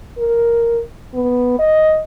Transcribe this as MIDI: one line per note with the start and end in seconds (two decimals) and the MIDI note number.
0.17 0.81 70
1.14 1.59 59
1.59 1.99 75